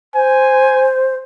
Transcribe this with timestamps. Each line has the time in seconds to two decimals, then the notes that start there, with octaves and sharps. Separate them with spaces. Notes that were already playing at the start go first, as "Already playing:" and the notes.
0.15 C5 G#5